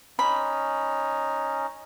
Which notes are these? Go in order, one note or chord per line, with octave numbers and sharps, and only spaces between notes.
C#4 D#4 B5